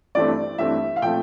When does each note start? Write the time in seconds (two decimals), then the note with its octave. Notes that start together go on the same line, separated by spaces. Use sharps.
0.15 G2 E3 A3 C4 D5
0.58 G2 E3 A3 C4 E5
0.96 F5
1.02 A#2 F3 A3 C4 G5